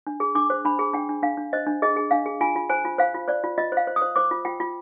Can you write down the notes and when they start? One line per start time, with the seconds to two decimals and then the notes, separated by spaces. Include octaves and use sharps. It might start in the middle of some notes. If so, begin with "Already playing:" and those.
0.07 D4
0.20 G#4
0.35 D4 D6
0.50 C5
0.65 D4 B5
0.79 G#4
0.93 D4 G5
1.09 D4
1.23 D4 F5
1.37 D4
1.53 C5 D#5
1.67 D4
1.82 G#4 D#5
1.96 G#4
2.11 D4 F5
2.26 G#4
2.41 F4 G#5
2.56 F4
2.69 C5 G#5
2.85 F4
2.98 C5 F5
3.14 F4
3.28 C5 D5
3.44 F4
3.58 F4 D#5
3.72 C5
3.77 F5
3.87 C5
3.96 D#6
4.01 C5
4.16 C5 D6
4.31 F4
4.45 F4 G5
4.60 F4